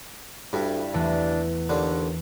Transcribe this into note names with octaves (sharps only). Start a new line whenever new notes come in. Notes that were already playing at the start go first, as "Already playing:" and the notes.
D2 G2 E4
E2 E3 A3 D4
D#2 D3